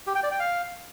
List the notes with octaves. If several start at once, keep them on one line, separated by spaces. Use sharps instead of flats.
G4
G5
D5
G5
F5